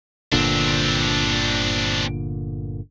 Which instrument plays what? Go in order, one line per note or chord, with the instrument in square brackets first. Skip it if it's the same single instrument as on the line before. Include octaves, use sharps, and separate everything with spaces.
[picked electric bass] G1 A#2 D3 [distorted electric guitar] C4 D4